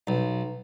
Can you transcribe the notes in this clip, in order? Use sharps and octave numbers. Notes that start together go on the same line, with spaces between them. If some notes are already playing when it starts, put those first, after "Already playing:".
B1